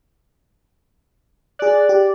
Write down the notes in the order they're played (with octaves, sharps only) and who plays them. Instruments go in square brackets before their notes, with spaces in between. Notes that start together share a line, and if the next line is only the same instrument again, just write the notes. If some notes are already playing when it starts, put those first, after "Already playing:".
[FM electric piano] G#4 F#6 [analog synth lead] D5
[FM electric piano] G4